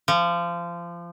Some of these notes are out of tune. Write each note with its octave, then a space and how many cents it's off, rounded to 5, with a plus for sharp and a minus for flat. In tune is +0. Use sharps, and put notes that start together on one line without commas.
F3 -25